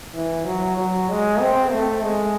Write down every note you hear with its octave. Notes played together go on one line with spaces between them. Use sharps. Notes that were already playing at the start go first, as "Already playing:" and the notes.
E3
F#3
F#3
G#3
C4
A3
G#3